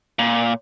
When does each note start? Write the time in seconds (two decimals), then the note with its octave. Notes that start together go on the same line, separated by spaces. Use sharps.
0.19 A#2